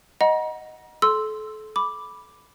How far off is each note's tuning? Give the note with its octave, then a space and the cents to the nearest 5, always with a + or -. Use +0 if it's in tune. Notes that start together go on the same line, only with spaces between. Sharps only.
D#5 +0 F#5 +0 A#5 +40
A4 -30 C6 +0 E6 +0
B5 +0 D6 +0